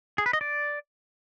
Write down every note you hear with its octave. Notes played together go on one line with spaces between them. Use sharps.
G#4
B4
D#5
D5